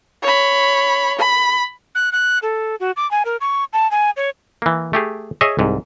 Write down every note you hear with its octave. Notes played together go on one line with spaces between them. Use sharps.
C#5 B5
B5
F#6
F#6
A4
F#4
D6
G#5
A#4
C#6
A5
G#5
C#5
E3 A#3
A3 G4 G#4
G#4 C#5 D#5 E5
C2 G#2